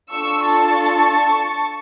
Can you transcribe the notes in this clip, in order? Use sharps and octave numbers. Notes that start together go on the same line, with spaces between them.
D4 F4 A4 C#6 E6
A5 C#6